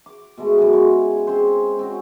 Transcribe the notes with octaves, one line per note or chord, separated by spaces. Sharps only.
D6
B2 G#3 A3
F#2 F#3 E4 G#5
C#3 G#3
C4 C#4 G#4 C5
C4 C#4 F#4